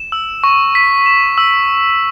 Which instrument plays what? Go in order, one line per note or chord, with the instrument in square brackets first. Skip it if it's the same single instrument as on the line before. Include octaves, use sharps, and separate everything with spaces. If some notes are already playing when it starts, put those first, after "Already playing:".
Already playing: [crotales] E7
E6
C#6
B6
E7
E6